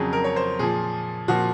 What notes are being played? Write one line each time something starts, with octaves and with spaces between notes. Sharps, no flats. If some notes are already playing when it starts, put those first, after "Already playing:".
Already playing: F2 C#3 F#3 G#4
A#4
C#5
C5
A#2 F3 G#4
A#2 F3 F#4